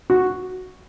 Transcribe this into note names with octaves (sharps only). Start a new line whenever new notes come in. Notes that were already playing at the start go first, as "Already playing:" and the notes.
F#4